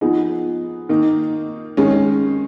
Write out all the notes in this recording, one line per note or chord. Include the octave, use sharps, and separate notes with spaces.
F3 B3 D#4 G#4
D#3 A#3 D#4
D#3 G#3 C#4